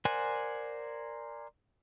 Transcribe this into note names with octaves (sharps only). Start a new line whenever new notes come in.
A#4 C5 D5 F#5 G#5